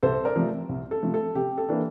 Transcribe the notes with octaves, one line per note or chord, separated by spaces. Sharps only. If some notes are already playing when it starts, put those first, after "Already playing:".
C2 A4 C5
A#4 D5
C3 F3 A3
C2
A4
C3 F3 A3
A4
C3 G4
A4
E3 A#3 D4